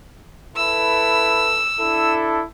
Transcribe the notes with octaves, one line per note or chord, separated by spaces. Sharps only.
E4 A4 B4 E6
D4 E4 A4